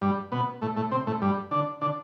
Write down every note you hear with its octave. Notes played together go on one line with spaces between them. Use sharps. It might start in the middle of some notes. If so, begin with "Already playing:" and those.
G2 G3
B2 B3
A2 A3
A2 A3
C3 C4
A2 A3
G2 G3
D3 D4
D3 D4